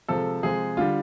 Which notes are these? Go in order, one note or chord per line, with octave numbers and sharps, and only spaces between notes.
C3 F3 G#3 A4
C3 F3 G#3 G#4
D3 G3 F4